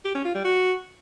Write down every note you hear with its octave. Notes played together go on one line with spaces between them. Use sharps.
G4
C#4
F4
G3
F#4